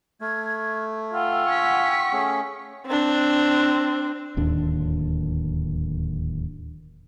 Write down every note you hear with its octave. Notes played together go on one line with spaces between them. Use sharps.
A3 F6 G#6
F4 F#5 G5 E6
G#5 C#6 B6
A3 C#4 G#4
C4 D4
D1 D#2 D4